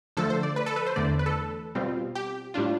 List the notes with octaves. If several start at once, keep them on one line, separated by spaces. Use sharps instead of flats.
D3 F3 A3 A4
C5
D5
B4
A4
B4
C5
E2 D3 A3 D5
B4
A4
B2 G3 C4 F4
G4
A2 G3 D4 F4